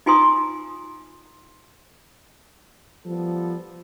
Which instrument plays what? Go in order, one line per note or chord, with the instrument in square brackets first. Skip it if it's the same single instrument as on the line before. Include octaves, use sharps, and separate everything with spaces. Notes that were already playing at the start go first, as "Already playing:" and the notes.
[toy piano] D#4 F4 G#5 A#5 C6 D#6
[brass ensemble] F3 G3 B3 A4